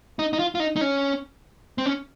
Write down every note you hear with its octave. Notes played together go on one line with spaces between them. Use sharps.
D#4
D#4
F4
F4
D#4
D#4
C#4
C4
C#4